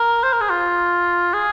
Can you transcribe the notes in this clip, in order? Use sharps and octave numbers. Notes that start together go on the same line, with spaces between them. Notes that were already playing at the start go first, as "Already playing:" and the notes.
Already playing: A#4
C5
A#4
G#4
F4
G#4